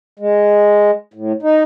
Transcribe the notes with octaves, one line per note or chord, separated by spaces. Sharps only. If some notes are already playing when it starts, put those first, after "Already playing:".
G#3
A2
D#4